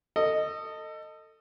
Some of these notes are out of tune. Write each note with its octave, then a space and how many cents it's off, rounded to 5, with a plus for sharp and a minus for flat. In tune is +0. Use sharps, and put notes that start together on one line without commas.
A4 +25 D#5 -5